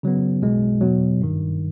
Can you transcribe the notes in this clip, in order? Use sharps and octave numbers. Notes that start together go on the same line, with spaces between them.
C#3 F#3 B3
B1 B2 G#3
E2 B2 F#3
G#1 G2 D#3